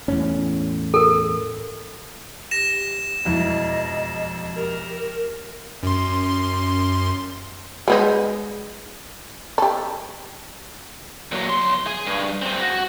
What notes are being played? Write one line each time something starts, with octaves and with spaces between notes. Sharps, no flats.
E2 A2 C#4
A4 A#4
G4 A#6 E7
E1 F2 E4 D#5
G4 A#4
F#2 C6
G#3 B3 D#4
G4 A4
A#2 F#3
B1 C6
G#4
G2
C4 G#4
F#4